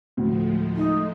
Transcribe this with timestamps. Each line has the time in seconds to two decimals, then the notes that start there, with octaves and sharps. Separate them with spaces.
0.17 D2 A2 F3 G#3 A3
0.76 D#4